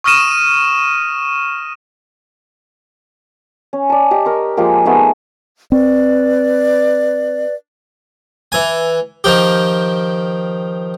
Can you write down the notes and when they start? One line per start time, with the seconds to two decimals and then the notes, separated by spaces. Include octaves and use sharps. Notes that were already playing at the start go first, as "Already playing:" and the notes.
0.04 C#6 D#6 F6 A#6 D#7 E7
3.73 C#4
3.90 D5 A5
4.11 G4 D#5
4.26 A#4 C#6
4.57 F3 G#3 A#3 G4
4.85 A3 B3 D#4 G#4
5.72 C4 B4 D5
8.52 E3 G#5
9.24 D#3 F3 G4